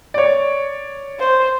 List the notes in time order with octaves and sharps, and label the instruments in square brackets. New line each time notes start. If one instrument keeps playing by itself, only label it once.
[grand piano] C#5 D5
[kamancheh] C5